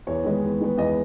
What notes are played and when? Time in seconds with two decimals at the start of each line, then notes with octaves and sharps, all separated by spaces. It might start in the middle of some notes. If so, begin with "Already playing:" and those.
0.07 E2 C#5
0.24 D#3 G#3 B3
0.43 E2
0.60 D#3 G#3 B3
0.78 E2 D#5